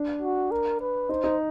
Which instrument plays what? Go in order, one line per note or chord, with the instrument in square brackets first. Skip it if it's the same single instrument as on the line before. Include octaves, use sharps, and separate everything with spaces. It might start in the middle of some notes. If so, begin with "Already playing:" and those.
Already playing: [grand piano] D4
[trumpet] F#4
A#4
B4
[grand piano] D#4 [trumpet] C5
[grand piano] D#4